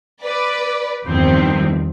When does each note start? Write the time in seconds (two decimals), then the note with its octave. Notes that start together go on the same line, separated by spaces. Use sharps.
0.23 B4 D5
1.06 E2 G2 D#3 F3 C4